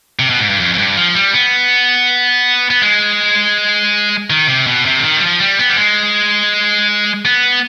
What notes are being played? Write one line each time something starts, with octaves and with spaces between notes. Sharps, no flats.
C3
B2
G#2
G2
F2
F2
G2
F3
G3
B3
B3
G#3
D#3
C3
B2
C3
D3
D#3
G3
F3
G3
B3
G3
G#3
B3